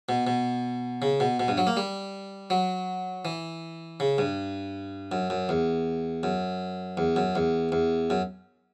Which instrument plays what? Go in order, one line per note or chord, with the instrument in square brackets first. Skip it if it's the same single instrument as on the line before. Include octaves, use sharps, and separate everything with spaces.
[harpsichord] B2
B2
C#3
B2
B2
G2
F#3
A#3
G3
F#3
E3
C#3
G2
F#2
F#2
E2
F#2
E2
F#2
E2
E2
F#2